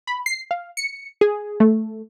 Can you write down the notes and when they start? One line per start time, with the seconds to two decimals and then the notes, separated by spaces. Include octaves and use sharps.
0.07 B5
0.26 C7
0.51 F5
0.77 C#7
1.21 G#4
1.60 A3